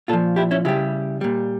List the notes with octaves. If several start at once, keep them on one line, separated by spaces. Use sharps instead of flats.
A#2 F3 F4 A4
E4 G4
C#4 E4
C#3 G3 E4 G4
A#2 G3